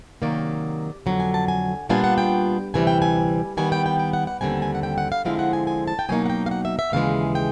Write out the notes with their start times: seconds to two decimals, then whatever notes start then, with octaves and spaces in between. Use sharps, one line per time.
0.22 C3 D#3 F#3 A#3 D5
1.06 F2 D3 F#3
1.20 G#5
1.34 A5
1.48 G#5
1.89 A#2 G3 B3 D4 F4 G#5
2.04 F#5
2.18 G5
2.74 D2 C3 E3 G3 G#5
2.87 G5
3.02 G#5
3.57 D#3 G3 B3 G#5
3.72 G5
3.86 G5
3.99 G5
4.13 F#5
4.27 F#5
4.41 D#2 D3 G3 C4 G#5
4.62 G#5
4.75 F#5
4.83 G5
4.98 F#5
5.12 F5
5.25 D3 F3 G#3 C4 E4 F5
5.39 F#5
5.53 G#5
5.67 G#5
5.88 A5
5.99 G5
6.09 B2 F#3 A#3 D#4 G#5
6.26 F#5
6.30 G5
6.46 F5
6.51 F#5
6.65 E5
6.79 E5
6.92 D#2 C#3 E3 G#3 F5
7.35 G5